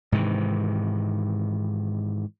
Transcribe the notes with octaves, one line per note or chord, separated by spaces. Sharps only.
G#2 C3 D#3 E3